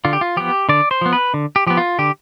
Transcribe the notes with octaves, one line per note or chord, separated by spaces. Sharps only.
D3 F4
G4
F4
F3 B3 G4
D3 D5
C5
F3 B3
B4
D3
G4
F3 B3 G4
F4
D3 G4